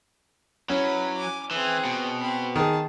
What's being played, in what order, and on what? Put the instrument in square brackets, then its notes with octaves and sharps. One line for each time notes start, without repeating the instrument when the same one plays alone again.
[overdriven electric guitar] F#3 [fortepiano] C#4 [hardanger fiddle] E4 B4
[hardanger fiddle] G#5 D6
[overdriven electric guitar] E3 [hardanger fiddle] C4 G#4
[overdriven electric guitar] B2
[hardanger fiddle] C4 B5
[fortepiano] D#3 G#4 [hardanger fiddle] A5